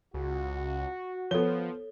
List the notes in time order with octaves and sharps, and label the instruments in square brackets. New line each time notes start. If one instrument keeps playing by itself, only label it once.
[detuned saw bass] C#2 [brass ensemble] F#4
[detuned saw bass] F3 [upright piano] B3 G7 [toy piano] A4 C#5